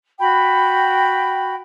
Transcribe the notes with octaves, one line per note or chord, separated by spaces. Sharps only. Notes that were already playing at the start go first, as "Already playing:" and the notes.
F#4 G5 B5